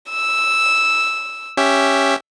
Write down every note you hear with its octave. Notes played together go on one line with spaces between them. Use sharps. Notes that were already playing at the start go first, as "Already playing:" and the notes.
E6
C#4 G4 E5